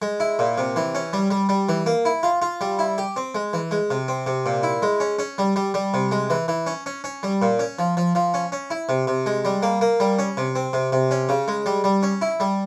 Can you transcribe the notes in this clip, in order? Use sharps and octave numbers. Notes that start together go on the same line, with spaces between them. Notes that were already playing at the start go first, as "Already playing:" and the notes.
G#3
E4
A#2
C3
E3
C#4
G3
G3
G3
E3
A#3
E4
F4
F4
G3
E4
G4
C4
G#3
E3
G#3
C3
C4
C3
A#2
E4
G#3
C#4
C#4
G3
G3
G3
C3
G#3
E3
E3
C#4
C#4
C#4
G3
A#2
C#4
F3
F3
F3
C#4
C#4
E4
C3
C3
G#3
G3
A#3
A#3
G3
C#4
C3
C4
C3
C3
C#4
C#3
G#3
G3
G3
C#4
E4
G3